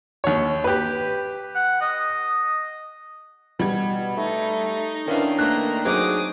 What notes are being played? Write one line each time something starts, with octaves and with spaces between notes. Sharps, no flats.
D#2 C#5
G4 B4
F#5
D#5
B2 G3 G#6
A3 D#4
D#3 C#4 D4 E4 B4 F5
A3 A#3 D4 A#5 F#6
F#3 C4 D#4 G#4 D6 D#6